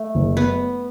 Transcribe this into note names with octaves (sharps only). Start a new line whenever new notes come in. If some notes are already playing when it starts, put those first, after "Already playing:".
Already playing: A3
F#1
B3